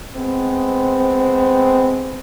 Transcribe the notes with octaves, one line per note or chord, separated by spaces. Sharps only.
G#3 B3 C4